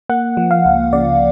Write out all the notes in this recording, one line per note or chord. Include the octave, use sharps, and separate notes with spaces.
A#3 F#5
F3
F5
C#2
C#3 D5